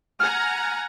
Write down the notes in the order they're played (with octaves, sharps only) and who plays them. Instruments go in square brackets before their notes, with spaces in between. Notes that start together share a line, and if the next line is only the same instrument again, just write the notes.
[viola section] F#5 G#5 A#5 [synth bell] F6